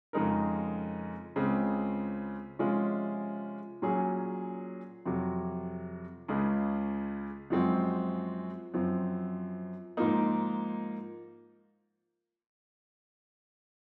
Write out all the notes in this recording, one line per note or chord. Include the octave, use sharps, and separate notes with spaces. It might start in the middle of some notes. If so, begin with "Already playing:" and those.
F2 C#3 G#3 D#4 A#4
C#2 C#3 G#3 C4
C3 F3 G#3 C#4 F4
A#2 F#3 C#4 G#4
F2 C3 F#3
C#2 C#3 G#3
F#2 F3 G#3 C4 F#4
F#2 F3 C4
G#2 F3 A#3 D#4